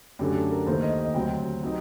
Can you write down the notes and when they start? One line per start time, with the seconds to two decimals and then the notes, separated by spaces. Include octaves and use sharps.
0.19 F#2 D3 A3 D4 G4
0.35 A4
0.51 A#4
0.67 D#2 D#3 A3 C5
0.82 D#5
0.99 D#5
1.14 D2 C3 F#3 C4 G5
1.63 C3 F#3 C4 D#4